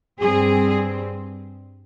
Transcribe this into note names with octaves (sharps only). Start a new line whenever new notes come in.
G2 G3 C4 G#4